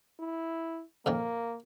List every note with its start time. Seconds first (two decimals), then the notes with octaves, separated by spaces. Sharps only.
0.20 E4
1.06 F2 A#2 D#3 A#3